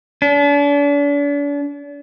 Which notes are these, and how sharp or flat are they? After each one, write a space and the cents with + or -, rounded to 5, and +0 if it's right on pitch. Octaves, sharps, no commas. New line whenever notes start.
D4 -40